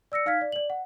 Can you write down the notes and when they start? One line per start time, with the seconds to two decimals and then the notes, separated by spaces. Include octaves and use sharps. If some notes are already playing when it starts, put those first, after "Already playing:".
0.12 D5 E6 A#6 C#7
0.26 D#4 F5 F6 G#6 B6
0.41 D5
0.52 D5 F#7
0.70 F#5